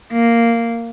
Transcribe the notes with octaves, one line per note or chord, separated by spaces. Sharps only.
A#3